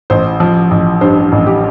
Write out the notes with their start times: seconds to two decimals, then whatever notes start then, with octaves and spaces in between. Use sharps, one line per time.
0.10 A1 C5
0.40 F3
0.71 A1
1.01 G2 C5
1.32 A1
1.47 G4